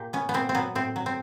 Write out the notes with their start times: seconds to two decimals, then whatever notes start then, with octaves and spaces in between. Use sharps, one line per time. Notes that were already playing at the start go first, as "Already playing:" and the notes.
Already playing: A#2 G4
0.13 B3 C#4
0.29 B3
0.34 A#2 C4
0.49 C4
0.55 F#3 B3
0.75 A2 C4
0.96 F#3
1.06 C4